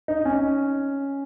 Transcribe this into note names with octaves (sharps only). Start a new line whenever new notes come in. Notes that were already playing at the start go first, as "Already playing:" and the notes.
D#4
C#4